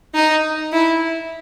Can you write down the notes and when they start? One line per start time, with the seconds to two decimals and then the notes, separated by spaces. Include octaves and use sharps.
0.15 D#4
0.73 E4